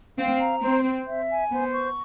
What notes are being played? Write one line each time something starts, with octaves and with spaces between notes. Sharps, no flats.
C4 F5
A#5
C4 C5
C5
E5
G#5
B3 C5
C#6